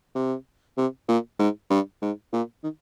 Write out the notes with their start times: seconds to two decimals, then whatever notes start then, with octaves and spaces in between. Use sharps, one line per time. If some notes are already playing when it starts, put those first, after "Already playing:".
0.15 C3
0.77 C3
1.08 A#2
1.39 G#2
1.70 G2
2.02 G#2
2.33 A#2
2.63 D#3